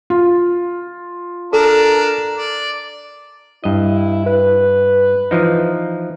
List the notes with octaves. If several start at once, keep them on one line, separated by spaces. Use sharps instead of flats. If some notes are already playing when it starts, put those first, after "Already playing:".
F4
D4 A4 A#4
D5
G2 E4 D#5
B4
E3 F3 D#4